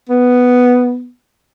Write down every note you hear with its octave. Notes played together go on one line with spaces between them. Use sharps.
B3